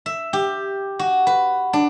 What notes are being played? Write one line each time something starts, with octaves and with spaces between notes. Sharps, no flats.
E5
G4
F#4
B4
D4